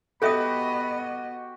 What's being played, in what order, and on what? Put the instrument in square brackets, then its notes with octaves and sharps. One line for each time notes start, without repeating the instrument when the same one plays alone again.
[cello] B3 D#5 [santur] F#4 G4 [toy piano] A4 E5 D#6 [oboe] B5